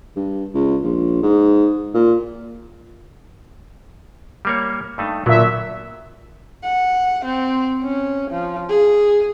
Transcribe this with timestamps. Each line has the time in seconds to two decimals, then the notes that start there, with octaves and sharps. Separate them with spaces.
0.16 G2
0.54 C#2
0.83 A#1
1.23 G#2
1.94 A#2
4.45 G3 A#3 C#5
4.98 G2 A3 D#4
5.26 A#2 D3 F#3 B3 E5
6.64 F#5
7.25 C4
7.83 C#4
8.31 F3
8.69 G#4